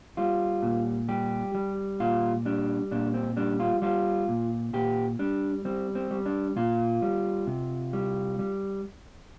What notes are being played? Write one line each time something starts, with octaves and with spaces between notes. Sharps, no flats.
G3 F4
A#2
G3 G4
G3
A#2 F4
G3 D4
A#2 D4
C4
G3 D4
F4
G3 F4
A#2
A#2 G4
G3 D4
G3 C4
C4
G3
D4
A#2 F4
G3
C3
G3
G3